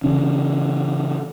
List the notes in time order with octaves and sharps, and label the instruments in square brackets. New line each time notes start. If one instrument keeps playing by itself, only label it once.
[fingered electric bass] C#3 E3 C#4 D4